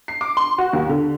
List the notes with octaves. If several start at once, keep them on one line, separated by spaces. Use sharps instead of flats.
C7
D6
C6
F#4
D#2
D3